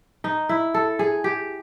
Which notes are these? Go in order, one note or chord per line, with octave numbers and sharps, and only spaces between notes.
D#4
E4
A4
G#4
G4